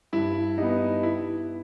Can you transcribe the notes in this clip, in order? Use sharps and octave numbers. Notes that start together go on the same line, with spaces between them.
G2 E4
G3 B3 D#4
E4